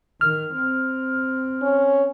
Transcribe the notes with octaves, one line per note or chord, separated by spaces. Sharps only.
D#3 F6
C4
C#4